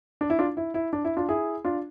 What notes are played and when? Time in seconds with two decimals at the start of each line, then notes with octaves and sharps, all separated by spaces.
0.21 D4
0.30 E4
0.39 D4 F4
0.57 E4
0.74 E4
0.93 D4
1.05 E4
1.17 D4 F4
1.29 E4 G#4
1.65 D4 F4